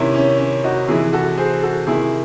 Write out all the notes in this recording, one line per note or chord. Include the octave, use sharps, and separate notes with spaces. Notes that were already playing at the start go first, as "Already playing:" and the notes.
Already playing: C3 D#3 C#4 E4
C#4
C#4
D#4 F#4
C3 E3 E4 G#4
F#4 A4
G#4 C5
F#4 A4
C3 D#3 E4 G#4